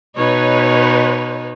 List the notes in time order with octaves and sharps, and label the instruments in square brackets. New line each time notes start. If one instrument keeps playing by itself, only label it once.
[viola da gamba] B2 D#4 [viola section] B4 C#5